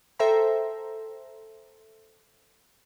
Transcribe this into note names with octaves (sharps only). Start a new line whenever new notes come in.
A4 C5 E5 G5 A#5